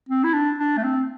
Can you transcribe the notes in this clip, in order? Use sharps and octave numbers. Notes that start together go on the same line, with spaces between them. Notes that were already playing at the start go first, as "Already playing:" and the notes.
C4
E4
D4
D4
A3
C4